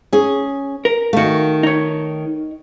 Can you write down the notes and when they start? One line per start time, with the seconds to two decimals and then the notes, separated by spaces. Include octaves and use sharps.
0.13 C#4 G#4
0.85 A#4
1.13 D#3 A3 F#4 F5
1.63 D#4 C#5